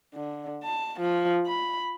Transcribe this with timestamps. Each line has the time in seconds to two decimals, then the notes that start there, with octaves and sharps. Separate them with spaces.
0.14 D3
0.63 A5
1.00 F3
1.46 B5